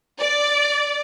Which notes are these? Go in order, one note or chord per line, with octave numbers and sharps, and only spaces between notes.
D5